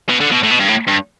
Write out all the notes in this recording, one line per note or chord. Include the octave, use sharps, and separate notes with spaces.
B2
D3
B2
A2
B2
G2
A2
G2